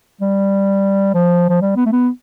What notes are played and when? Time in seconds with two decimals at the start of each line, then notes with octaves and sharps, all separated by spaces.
0.21 G3
1.14 F3
1.49 F3
1.61 G3
1.76 B3
1.86 A3
1.92 B3